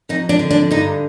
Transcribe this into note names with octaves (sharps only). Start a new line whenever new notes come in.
F2 D#4
D4
D3
D4
G2 D#4